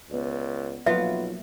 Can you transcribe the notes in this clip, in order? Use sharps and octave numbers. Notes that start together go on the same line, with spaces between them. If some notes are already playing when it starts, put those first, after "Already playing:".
C#2 B3 D5
B1 F3 F#3 A#3 B3 F4 E5